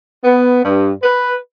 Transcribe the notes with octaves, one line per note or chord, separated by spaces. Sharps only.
B3
G2
B4